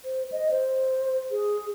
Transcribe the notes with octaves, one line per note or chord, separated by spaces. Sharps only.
C5
D#5
C5
G#4